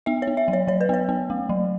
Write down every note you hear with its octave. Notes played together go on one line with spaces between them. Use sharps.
B3 E5
C#5
B3
E5
F#3
C#5
F#3 C#5
B4
B3 C#5
B3
A3
F#3